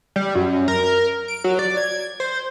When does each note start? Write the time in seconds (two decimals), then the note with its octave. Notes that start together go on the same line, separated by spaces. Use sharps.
0.16 G3
0.35 F#2
0.68 A#4
1.28 D7
1.44 F#3
1.59 D5
1.77 G#6
2.20 C5